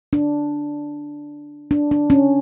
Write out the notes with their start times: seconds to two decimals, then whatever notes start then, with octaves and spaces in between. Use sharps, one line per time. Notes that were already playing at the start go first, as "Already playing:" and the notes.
0.13 D4
1.71 D4
1.91 D4
2.10 C#4